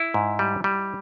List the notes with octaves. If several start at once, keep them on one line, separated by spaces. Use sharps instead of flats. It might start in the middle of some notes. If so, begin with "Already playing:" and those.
Already playing: E4
G#2
G3
G3